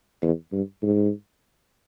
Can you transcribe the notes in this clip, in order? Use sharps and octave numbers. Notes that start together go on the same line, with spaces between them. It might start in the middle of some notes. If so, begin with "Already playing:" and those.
E2
G2
G#2